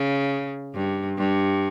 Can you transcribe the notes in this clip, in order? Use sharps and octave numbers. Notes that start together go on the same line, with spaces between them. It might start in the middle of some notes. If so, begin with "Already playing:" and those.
Already playing: C#3
G2
G2